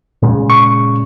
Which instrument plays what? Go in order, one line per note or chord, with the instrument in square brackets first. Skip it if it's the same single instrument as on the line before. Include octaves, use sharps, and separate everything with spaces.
[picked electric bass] A#2 C#3 G#3
[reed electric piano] C#6